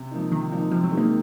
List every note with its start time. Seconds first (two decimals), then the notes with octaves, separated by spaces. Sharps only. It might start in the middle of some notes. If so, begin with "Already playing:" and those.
Already playing: C3
0.11 F3 A#3 D#4
0.32 C3 D#3
0.52 F3 A#3 D#4
0.71 C3 F3
0.84 F#3
0.91 D#3 G#3 D#4
0.98 A#3